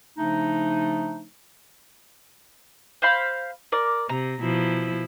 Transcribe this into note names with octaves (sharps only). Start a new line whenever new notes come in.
C#3 F3 A3 D4 D#4
C5 F5 B5
A#4 D5
C3 A#5
B2 F3 E4